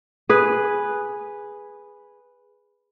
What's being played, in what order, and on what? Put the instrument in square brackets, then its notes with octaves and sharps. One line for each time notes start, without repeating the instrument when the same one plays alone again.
[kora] G#4 B4